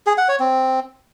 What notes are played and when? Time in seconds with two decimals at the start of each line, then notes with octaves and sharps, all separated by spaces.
0.07 G#4
0.18 F#5
0.29 C#5
0.40 C4